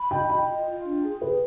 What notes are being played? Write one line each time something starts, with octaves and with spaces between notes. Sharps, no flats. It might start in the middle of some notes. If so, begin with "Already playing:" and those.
Already playing: B5
D#5 G5
D#5 G5
F4
F4
D4
G#4
G#4 B4